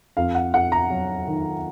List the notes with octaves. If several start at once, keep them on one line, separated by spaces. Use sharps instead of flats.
F2 F5
F#5
F2 F#5
A#5
F#3
D#3